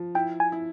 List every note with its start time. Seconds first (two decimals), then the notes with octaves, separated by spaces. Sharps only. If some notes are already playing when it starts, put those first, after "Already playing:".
Already playing: F3
0.15 E4 G5
0.40 G#5
0.52 E4